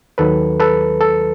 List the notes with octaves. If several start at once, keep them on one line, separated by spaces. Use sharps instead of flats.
D#2 D#3 F#3 A4 B4
A4 B4
A4